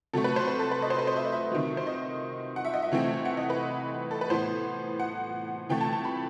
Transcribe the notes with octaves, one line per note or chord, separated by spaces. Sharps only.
C3 F#3 A3 A4
B4
C5
B4
A4
B4
D#5
C5
B4
C5
E5
D#5
E5
C3 D#3 F#3
C5
D#5
F#5
E5
D#5
E5
C3 E3 A3 C4
F#5
D#5
B4
A4
B4
A2 E3 B3 C5
F#5
C3 E3 A3 G5
A5
A5
B5